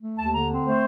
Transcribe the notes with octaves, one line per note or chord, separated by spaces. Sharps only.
A3
D#2 A5
D3 A#5
C4
A3 C5